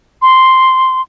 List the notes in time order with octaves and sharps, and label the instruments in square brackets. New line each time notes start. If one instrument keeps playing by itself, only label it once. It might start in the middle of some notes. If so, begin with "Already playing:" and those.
[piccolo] C6